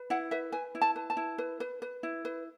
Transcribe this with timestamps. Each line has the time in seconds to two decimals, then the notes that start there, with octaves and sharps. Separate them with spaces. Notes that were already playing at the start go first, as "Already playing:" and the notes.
Already playing: B4
0.10 E4 F#5
0.31 B4 E5
0.52 B4 G#5
0.75 E4
0.81 A5
0.96 B4
1.10 A5
1.17 E4
1.38 B4
1.60 B4
1.82 B4
2.03 E4
2.25 B4